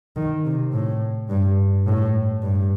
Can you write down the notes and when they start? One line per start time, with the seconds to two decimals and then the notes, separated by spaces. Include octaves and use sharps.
0.17 D#3
0.45 C3
0.73 A2
1.29 G2
1.86 A2
2.43 G2